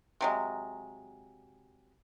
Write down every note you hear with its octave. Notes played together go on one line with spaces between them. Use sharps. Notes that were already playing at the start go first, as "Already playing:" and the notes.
C3 F#3 G#3